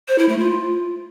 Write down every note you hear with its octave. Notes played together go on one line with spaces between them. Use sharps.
C5
E4
A3
F4